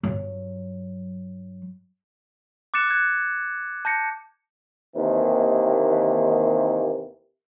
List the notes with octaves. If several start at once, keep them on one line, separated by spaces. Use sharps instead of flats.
G2 F#3
D6 F#6 A6 C#7 E7
F#6 G#6
A5 G6 A#6 C#7
D#2 C3 D#3 E3 A#3